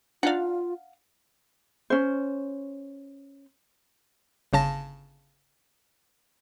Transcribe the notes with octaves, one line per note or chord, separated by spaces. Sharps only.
D4 D#4 F4 D5 F5 F#5
C#4 C5
G1 C#3 A5 A#6